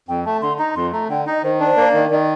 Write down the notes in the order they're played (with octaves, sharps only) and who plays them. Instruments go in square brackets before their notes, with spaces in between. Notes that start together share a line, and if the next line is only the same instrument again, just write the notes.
[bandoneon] F2 [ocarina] G5
[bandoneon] A3 [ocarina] A5
[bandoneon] D3 [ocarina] C6
[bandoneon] D#4 [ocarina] A#5
[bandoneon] F2 [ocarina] C6
[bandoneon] A3 [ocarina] A#5
[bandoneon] D3 [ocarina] G5
[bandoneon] D#4 [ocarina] D#5
[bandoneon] D#3 [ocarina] C5
[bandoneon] D4
[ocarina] C5
[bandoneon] A#3 [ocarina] C5
[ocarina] D5
[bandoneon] D#3
[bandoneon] D#3 [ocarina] D5